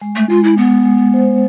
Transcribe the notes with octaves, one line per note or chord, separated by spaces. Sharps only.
G#3
A3
G#3 F4
E4
G#3 B3
G#3
C5